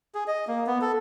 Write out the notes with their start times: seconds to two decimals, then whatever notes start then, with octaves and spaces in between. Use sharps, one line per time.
0.15 G#4
0.28 D#5
0.48 A#3
0.67 B3
0.81 A4